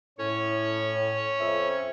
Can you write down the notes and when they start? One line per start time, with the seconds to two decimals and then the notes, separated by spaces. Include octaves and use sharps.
0.18 A2 C#4 C#5
1.39 F2 E5